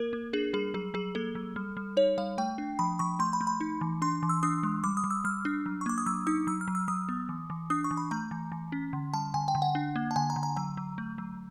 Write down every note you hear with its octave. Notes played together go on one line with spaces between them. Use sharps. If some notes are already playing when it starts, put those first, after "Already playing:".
Already playing: A#3 A#4
A#3
D4 G#4
G3 G#4
F#3 G#4
F#3 G#4
A#3 A4
F#3
G3
G3
D#4 C#5
G3 F5
A3 G5
D4
F3 B5
F3 C#6
A3 C6
B5
A3
B5
D#4
E3
D4 C6
E3
E6
D4 D#6
G#3
G3 D6
D#6
G3
E6
G3 F6
D4
F#3
C#6
A#3 D6
D#6
F#3 E6
D#4 D#6
F#3 E6
F6
F#3
E6
F#3 D#6
B3
E3
E3
D4 D#6
C#6
E3
B5
A3 A#5
E3
E3
C#4
D3
G3 A5
D3 G#5
G5
D3
F#5
D4
A#3
A5
D3 G#5
A#5
D3
A#5
F#3 A#5
F#3
A3
F#3